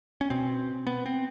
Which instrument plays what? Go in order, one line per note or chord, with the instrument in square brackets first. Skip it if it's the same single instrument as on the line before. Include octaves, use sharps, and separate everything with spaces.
[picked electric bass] C#4
B2 C4
B3
C4